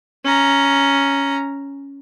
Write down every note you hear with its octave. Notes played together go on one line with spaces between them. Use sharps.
C#4 A#5